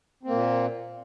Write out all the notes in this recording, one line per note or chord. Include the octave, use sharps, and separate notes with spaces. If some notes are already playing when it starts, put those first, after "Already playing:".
A#2 A#3 C4